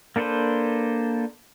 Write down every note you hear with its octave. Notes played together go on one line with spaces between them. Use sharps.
A#3 D4 A4 B4 C5